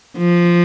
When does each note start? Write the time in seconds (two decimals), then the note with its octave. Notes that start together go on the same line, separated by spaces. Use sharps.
0.18 F3